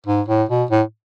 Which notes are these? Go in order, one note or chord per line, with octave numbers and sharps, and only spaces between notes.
G#2
A2
B2
A2